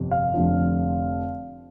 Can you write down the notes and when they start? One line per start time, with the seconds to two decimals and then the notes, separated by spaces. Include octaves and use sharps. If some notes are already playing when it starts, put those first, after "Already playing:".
Already playing: G1 F2 C3
0.11 F5
0.34 F1 F2 D3 F3